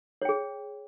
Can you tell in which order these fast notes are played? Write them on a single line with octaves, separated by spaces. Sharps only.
C#5 G5 G#4